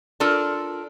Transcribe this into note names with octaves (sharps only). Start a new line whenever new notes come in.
D4 F4 A4 A#4